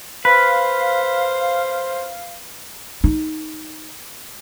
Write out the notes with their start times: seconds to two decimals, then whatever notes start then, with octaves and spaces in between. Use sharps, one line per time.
0.25 B4 C5 F5
3.04 D#4